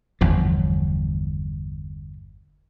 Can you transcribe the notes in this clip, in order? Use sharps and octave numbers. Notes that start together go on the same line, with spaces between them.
G1 E2 F3